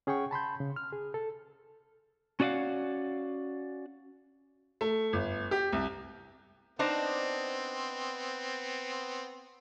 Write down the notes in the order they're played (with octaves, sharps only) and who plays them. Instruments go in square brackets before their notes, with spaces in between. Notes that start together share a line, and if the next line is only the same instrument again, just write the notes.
[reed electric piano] C#4 G#4 F#5 G5 C#6
A5 B5 C6 G6
C#3
F6
G#4
A4
[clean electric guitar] C#4 F#4 D5 D#5 F5 F#5
[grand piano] A3
G1
G4
C2
[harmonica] B3 C4 [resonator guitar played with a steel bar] D4 D#4 C5